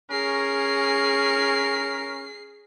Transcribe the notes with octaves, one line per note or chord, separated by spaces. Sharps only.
C#4 G#4 A#4 C7